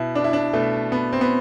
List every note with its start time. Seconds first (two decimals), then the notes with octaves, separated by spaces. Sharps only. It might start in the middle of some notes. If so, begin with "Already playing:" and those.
Already playing: B2 E4
0.15 D4
0.24 E4
0.33 D4
0.53 B2 A3
0.92 B3
1.13 C4
1.21 B3